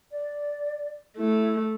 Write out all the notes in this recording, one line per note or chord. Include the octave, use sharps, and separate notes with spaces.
D5
A3 E4